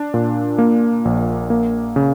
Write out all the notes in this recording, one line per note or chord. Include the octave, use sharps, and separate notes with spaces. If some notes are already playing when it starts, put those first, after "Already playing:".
Already playing: D4
A#2
A#3
A#1
A#3
C#3